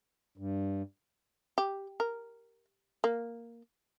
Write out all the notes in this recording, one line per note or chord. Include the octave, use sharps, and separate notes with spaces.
G2
G4
A#4
A#3